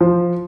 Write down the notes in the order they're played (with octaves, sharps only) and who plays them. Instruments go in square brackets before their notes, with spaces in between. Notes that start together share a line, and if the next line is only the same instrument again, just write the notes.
[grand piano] F3